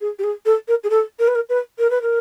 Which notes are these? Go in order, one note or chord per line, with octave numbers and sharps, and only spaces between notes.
G#4
G4
G#4
A4
A#4
G#4
A4
A#4
B4
A#4
B4
A#4
B4
A#4